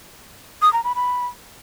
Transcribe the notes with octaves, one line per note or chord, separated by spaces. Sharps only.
D#6
A#5
B5
B5